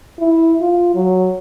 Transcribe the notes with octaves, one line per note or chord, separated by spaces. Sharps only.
E4
F4
F#3